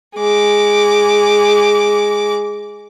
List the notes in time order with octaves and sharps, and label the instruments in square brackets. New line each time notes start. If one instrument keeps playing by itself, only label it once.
[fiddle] G#3 D6